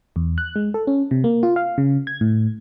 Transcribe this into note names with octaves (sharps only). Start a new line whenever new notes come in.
E2
F#6
G#3
A4
C#4
C3
A#3
F4
F5
C#3
G#6
A2